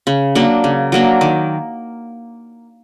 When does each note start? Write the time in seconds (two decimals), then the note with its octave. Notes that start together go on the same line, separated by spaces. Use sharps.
0.07 C#3
0.35 F#3 A#3 D4
0.64 C#3
0.92 F#3 A#3 D4
1.21 D#3